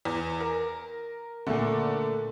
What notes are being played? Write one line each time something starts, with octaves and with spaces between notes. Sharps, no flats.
E2
A#4
A#2 D3 A3